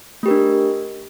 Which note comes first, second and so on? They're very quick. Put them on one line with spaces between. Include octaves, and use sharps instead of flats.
A3 G4 A#4 D4